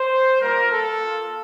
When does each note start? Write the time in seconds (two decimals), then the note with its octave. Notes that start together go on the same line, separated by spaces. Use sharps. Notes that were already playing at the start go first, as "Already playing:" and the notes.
Already playing: C5
0.41 G3 A#3 F4 A#4
0.70 A4
0.99 A#3 F4